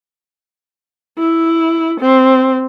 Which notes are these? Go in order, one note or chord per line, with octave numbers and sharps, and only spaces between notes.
E4
C4